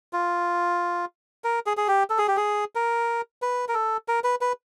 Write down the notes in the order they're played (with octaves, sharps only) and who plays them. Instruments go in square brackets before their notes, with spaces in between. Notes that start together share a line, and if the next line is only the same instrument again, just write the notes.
[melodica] F4
A#4
G#4
G#4
G4
A4
G#4
G4
G#4
A#4
B4
A#4
A4
A#4
B4
B4